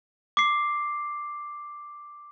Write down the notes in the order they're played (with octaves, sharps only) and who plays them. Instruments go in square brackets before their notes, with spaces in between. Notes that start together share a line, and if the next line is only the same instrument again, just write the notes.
[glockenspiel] D6 C7